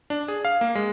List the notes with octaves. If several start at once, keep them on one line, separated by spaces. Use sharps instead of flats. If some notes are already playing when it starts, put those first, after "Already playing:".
D4
G#4
F5
A#3
G#3